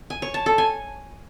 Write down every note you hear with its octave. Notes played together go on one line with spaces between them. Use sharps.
G#5
C#5
A5
A4
G#5